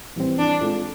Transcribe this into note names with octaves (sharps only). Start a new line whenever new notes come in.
E3 G3 C4
E3 D4
G#3 C4 F4 A4